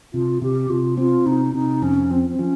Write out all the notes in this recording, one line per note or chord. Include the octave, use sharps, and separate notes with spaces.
C3 F4
C3 G4
C3 F4
C4 F4
C3 D#4
C3 D#4
F2 C#4
F3 C4
C4
F3 C#4